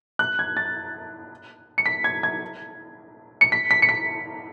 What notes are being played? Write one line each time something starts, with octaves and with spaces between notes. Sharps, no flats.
F#6
G#6
A6
C#7
B6
G#6
G#6
C#7
B6
B6
C#7
B6